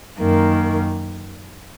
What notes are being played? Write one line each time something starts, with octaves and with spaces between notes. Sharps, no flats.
F#2 D#3 A#3